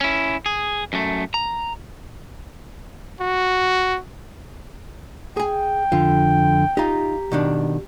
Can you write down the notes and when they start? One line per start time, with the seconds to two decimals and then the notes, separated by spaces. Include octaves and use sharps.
0.01 C#4 E4
0.46 G#4
0.93 F#2 A3
1.34 A#5
3.20 F#4
5.37 G#4 G5 G#5
5.92 F2 D3 F4
6.77 D#4 F4 G4 A#5
7.32 B2 D#3 D4